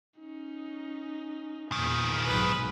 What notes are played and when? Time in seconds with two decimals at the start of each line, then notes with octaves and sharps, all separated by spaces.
0.19 C#4 D#4
1.72 E2 A#2 D#3 F3 G#5 B5
2.26 B1 G#2 B4